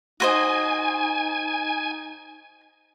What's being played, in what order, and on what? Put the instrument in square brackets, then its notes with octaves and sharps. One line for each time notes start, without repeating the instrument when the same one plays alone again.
[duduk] D#4 [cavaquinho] F#4 C5 D#5 [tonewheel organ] G#5